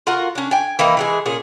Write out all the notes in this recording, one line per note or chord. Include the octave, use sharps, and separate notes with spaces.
F4 F#4 A#4 F#5
C#4 D4
G5 G#5
E3 A#3 C4 D#4
E3 G#3 G#4
A#2 C#4 G#4